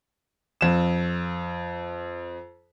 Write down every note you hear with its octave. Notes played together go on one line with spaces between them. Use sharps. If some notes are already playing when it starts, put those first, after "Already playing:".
F2 E7